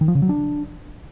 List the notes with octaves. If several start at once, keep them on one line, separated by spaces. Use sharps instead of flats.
D#3
F3
C#3
F#3
D4